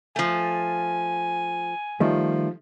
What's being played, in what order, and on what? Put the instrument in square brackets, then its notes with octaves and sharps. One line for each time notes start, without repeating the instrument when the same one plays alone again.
[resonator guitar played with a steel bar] F3 A3 [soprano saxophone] G#5
[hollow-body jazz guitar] D#3 G3 A3 [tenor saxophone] F3